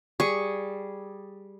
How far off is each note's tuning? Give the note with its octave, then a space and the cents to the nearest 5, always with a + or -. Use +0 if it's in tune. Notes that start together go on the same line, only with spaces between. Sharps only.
G3 +0 G#4 +0 C#6 +0